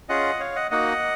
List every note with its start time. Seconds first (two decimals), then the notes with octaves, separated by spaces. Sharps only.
0.09 C#4 F4 G#4 D#5 F#5
0.40 C#5 F5
0.56 D#5 F#5
0.71 A#3 D#4 F#4 D#5 F#5